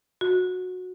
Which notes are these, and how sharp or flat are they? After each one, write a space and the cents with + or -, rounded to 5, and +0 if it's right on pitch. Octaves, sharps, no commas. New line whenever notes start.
F#4 -15